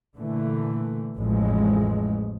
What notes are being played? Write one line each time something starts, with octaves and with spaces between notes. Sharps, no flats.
A#2 D3 E3 A3
A1 F2 E3 F3 G#3